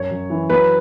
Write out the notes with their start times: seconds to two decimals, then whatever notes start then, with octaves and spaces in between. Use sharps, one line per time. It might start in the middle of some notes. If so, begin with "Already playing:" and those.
Already playing: F#2 C#5
0.11 F#2
0.30 E3
0.50 F#3 B4